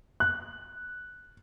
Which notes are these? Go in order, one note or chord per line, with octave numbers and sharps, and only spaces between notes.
F#6